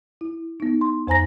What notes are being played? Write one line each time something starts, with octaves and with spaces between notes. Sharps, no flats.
E4
B3 D#4
C6
F2 C5 G#5 A#5 A#6